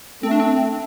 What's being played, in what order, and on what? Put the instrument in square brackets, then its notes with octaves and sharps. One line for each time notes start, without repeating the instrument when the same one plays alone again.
[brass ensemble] A3 [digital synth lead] C4
[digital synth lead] D4
C4